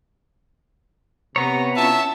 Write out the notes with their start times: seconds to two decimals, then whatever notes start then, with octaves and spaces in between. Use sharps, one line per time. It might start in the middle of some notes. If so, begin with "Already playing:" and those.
1.36 C3 B3 C#5 A#5
1.76 C#4 E4 F4 E5 A5